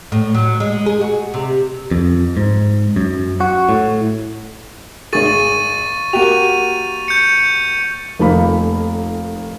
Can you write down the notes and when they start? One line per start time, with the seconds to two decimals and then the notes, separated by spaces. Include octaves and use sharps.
0.12 A2
0.34 F#3
0.60 G#3
0.86 G#4
1.01 F#4
1.34 C3
1.91 F2
2.37 G#2
2.96 F#2
3.41 F#4
3.69 A2
5.13 G#1 G#4 C#6 A6 D#7
6.13 A#3 F#4 G4 D#7 F7
7.08 G6 C#7
8.19 F1 F2 D#3 A#3 F5 B5